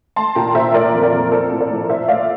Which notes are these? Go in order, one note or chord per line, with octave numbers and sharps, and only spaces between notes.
A3 A5 C6
A#2 G5 A#5
A#2 C5 E5
A3 A#4 D5
F2
A#4 D5
F2
A#3 A4 C5
A2
A#4 D5
A2
A#2 C5 E5
A3 D5 F5